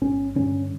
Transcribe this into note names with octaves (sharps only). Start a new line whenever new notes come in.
G1 C#4
G2 D3 C#4